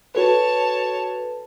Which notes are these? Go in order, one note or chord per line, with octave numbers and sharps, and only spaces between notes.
F#4 A4 B4 C#5 A5